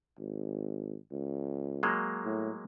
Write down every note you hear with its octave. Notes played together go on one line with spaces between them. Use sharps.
G#1
C#2
F#3 G#3 A#3
A2